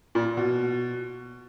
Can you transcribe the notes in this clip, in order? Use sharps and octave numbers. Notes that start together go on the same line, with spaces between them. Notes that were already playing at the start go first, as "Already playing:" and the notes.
A#2
B2